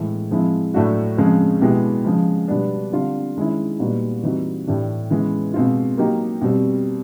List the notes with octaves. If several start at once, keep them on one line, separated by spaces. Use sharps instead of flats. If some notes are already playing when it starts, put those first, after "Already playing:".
Already playing: A2 E3 G#3
F3 G#3 C4 E4
A2 F#3 A3 D4 F#4
C#3 F3 G#3 C4
B2 G#3 B3 E4 G4
C#3 F3 G#3
B2 G3 B3 D4
D3 G3 C4 F4
D#3 G#3 C#4 E4
A#2 G3 B3 D#4 F#4
E3 G3 C4 D#4 F#4
A2 E3 A3 D4 G4
C#3 E3 G#3 B3
B2 G#3 C4 F4
F#3 A#3 D#4 G4
B2 G3 C4